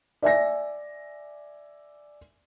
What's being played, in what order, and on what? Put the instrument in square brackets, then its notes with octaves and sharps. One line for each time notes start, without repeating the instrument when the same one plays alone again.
[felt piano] D5 E5 G#5 A#6